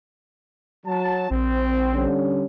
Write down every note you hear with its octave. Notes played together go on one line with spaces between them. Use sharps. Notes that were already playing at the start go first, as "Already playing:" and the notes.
F#3 A5
A#1 C4
D3 G3 C#4